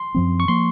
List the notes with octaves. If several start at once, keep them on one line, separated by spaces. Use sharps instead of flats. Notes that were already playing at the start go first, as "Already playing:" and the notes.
Already playing: C6
F#2 F3 C4
C#6
F3 A#3 C6